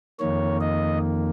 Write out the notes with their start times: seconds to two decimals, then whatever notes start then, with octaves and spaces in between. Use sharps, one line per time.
0.19 F2 D#3 A#3 C#5
0.61 D#5